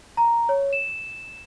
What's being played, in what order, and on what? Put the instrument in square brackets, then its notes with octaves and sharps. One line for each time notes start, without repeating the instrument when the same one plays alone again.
[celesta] A#5
C#5
E7